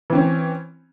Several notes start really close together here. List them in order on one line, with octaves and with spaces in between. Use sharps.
E3 C4 C#4